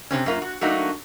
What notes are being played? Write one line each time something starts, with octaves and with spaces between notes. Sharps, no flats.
C3 E3 C4 C#4
F#2 A#3 F4
F#4
F#3 A3 A#3 D4 D#4 F#4